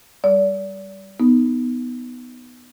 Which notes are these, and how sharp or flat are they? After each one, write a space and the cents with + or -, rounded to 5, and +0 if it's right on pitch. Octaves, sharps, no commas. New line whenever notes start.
G3 +0 D5 -35
B3 +5 D#4 +0